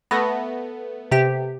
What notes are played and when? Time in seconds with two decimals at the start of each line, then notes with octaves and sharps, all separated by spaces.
0.11 A3 B3 A#6
1.11 C3 G4